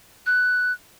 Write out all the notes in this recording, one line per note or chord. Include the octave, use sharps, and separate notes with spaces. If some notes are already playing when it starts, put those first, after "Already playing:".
F#6